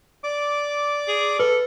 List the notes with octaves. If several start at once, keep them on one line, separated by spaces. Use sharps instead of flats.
D5 D6
G#4
A4 B4